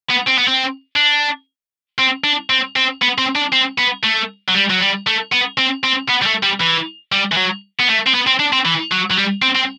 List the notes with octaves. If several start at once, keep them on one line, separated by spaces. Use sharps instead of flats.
B3
C4
B3
C4
D4
C4
D4
C4
C4
B3
C4
D4
C4
B3
A3
F#3
G3
F#3
G3
A3
B3
C4
C4
B3
G3
A3
G3
E3
G3
E3
F#3
B3
A3
C4
B3
C4
D4
C4
E3
F#3
F#3
G3
C4
C4